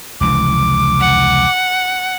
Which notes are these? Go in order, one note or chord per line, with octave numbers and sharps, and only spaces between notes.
F1 C#2 E3 D6
F#5